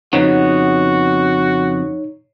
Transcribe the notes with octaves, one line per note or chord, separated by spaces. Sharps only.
F2 C#3 B3 D#4 F#4 C#5